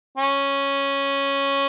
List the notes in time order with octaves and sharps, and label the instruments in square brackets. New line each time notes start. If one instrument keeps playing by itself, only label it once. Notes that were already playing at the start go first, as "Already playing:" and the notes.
[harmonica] C#4